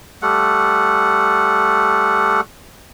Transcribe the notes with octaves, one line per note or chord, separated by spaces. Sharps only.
G3 A3 F#5